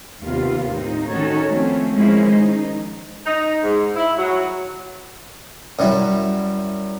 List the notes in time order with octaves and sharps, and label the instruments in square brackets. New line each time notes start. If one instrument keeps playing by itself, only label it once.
[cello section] D#2 C3 B3 F4
A2 C4 D#4
D#3 C#4 D#4 F#4 A4 C#5
F3 A3 C4 C#4
D#3 F3 G#3 C#4 E4 C5
D#4
[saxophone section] D#4
G#2
E4
F#3
[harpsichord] F#2 F#3 G3 E4